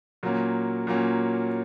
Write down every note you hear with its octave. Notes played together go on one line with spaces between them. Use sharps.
A#2 F#3 A#3 C#4
A#2 F#3 A#3 C#4